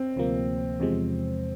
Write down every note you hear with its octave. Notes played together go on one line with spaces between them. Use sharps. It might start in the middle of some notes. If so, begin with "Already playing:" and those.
Already playing: C4
D2 C3 F3 A#3
E2 C3 F3 G#3